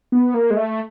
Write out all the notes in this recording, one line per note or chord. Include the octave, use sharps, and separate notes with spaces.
B3
A#3
G#3
A3